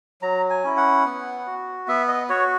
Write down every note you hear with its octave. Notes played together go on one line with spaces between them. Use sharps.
F#3 A#5
G#5
C#4 E4
F#5
B3
F#4
B3 E5
D#5
F#4 C#5